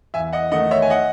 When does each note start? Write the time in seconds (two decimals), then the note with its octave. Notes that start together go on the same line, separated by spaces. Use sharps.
0.14 E2 E5 G#5
0.33 D#5 F#5
0.52 D#3 A3 D#4 D#5 F#5
0.71 C#5 E5
0.82 G#5
0.90 D#5 F#5